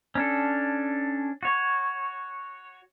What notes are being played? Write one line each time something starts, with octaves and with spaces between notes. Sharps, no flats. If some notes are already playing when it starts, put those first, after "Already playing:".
C#4 D4 A4
F#4 C#5